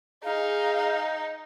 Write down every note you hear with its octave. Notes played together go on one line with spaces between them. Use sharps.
D#4 G#4 F5